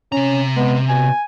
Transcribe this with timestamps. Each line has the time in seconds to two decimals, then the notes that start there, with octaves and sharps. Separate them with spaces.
0.12 C3 C#4 A#5
0.56 G#3 B3
0.89 B2 G#5